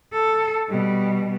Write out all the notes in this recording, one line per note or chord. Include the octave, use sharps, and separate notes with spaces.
A4
B2 G3